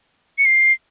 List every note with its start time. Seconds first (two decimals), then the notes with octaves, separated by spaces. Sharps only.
0.38 C#7
0.45 C7